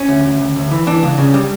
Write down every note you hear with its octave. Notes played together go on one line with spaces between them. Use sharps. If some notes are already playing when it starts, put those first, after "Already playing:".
Already playing: C#4
D2
D2
D2
D2
E3
E3 D4
C#2
C#3
G3